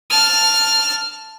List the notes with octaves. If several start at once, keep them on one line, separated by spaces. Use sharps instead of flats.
A5 F6